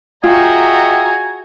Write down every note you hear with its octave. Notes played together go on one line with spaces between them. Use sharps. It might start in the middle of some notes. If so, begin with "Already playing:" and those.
F4 F#4 G#4 D#5 E5 G5 G#5 A#5